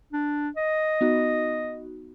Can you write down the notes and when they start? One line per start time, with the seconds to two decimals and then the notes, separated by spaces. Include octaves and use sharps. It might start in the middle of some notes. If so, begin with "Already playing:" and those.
0.13 D4
0.57 D#5
1.01 B3 D#4 F#4